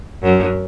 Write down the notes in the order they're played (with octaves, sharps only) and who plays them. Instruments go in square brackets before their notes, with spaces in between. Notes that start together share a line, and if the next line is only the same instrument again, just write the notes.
[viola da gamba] F#2